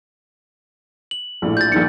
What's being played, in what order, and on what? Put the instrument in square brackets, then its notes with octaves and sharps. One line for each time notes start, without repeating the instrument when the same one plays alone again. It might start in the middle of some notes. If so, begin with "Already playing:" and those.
[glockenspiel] F#7
[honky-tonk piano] A#1 A2
[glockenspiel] G6 A6
[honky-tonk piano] A#1 D#3 C#7